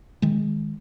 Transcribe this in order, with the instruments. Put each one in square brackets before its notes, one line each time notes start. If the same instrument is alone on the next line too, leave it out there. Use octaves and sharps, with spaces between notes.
[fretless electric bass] D#3 G#3